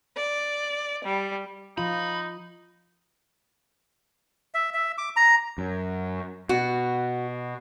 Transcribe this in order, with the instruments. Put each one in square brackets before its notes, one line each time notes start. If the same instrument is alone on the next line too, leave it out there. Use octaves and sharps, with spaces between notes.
[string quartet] D5
G3
[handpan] F3 F4 [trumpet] D#4 [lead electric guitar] B5
[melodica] E5
E5
D6
A#5
[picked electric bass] F#2
[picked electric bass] B2 [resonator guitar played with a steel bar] F#4